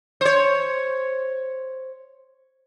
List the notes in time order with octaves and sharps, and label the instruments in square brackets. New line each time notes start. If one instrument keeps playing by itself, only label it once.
[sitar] C5 C#5